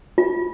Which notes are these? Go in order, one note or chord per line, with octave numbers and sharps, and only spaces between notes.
F4